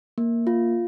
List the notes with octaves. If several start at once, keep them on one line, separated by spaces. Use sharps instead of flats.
A#3
F4